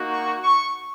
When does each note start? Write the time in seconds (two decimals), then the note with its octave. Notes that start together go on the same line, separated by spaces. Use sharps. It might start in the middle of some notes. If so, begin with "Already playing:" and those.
Already playing: A#3 D#4 F#4
0.10 C#6
0.44 C#6